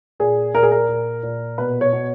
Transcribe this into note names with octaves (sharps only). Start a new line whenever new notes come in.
A#2 G#4
A#2 A#4
G#4
A#4
A#2
A#2
B2 B4
C#5
B2